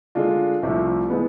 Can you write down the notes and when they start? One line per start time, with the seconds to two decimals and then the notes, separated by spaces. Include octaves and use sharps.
0.15 D3 G#3 D4 F4
0.63 C2 C3 F3 A3
1.10 E3 G#3 B3